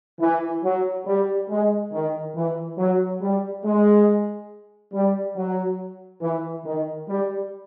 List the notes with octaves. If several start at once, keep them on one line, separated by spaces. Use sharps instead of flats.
E3
F#3
G3
G#3
D#3
E3
F#3
G3
G#3
G3
F#3
E3
D#3
G3